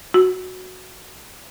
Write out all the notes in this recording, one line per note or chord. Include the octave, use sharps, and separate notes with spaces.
F#4